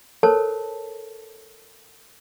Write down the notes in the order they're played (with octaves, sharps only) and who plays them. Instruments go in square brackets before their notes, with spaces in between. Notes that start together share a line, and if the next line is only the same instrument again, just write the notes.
[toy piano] A4 A#4 C5 C#5 A5